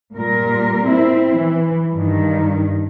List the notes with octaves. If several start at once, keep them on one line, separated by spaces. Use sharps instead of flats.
A#2 G3 A#4
C4 E4
E3
G2 D#3